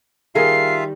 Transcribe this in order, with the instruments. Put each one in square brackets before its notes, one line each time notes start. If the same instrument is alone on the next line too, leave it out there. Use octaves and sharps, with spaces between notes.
[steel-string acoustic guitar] D#3 G3 [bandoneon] F4 E5 F5 [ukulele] G#4 A#4 [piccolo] C7